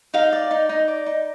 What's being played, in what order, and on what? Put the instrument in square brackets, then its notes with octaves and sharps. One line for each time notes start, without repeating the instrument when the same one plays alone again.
[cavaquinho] D#4 F5
D5
D#4
D#4
D5
D#4